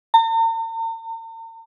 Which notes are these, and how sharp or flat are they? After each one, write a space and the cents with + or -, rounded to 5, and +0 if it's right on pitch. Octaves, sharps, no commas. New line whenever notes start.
A#5 -45